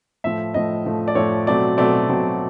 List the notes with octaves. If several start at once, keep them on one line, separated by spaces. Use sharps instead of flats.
A2 F3 A3 E5
A2 F3 A3 D#5
A2 F3 A3
D5
A2 F3 A3 C#5
B2 F#3 A3 C4 D5
B2 F#3 A3 C4 D5
B2 F#3 A3 C4